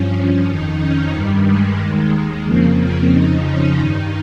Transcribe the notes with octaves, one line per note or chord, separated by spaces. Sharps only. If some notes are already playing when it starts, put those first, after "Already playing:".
Already playing: G2 F3 C#4
C#4
F2 D#3 D#4
C#4
G2 D#3 G3
G#3
D#2 D#3
F2 C#3 F3 A#3
C4
F2 C#3 F3 D#4
C#4
G2 D#3 D#4